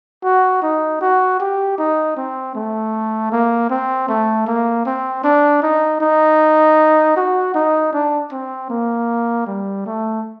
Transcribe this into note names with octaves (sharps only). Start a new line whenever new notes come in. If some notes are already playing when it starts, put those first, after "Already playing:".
F#4
D#4
F#4
G4
D#4
C4
A3
A#3
C4
A3
A#3
C4
D4
D#4
D#4
F#4
D#4
D4
C4
A#3
G3
A3